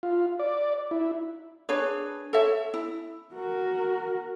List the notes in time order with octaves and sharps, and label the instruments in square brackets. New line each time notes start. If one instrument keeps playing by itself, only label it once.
[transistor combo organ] F4
D5
E4
[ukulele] D4 G#4 B4 C#5
A4 C#5 E5
E4
[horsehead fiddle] F#4 A#4